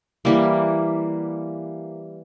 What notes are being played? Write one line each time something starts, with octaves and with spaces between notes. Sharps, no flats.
E3 G3 A#3